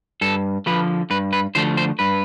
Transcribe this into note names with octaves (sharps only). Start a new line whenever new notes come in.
G2 A4
D3 F3 A3 B4
G2 B4
B4
D3 F3 A3 C5
C5
G2 B4